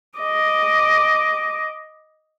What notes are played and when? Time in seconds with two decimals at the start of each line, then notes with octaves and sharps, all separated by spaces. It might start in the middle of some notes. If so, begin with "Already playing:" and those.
0.18 D#5 D6